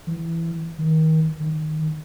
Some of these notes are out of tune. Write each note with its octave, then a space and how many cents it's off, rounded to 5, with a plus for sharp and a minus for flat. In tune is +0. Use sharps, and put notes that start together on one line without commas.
E3 +10
D#3 +30
D#3 -10